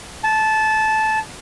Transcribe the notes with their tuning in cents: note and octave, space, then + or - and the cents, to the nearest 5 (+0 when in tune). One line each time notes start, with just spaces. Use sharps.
A5 -15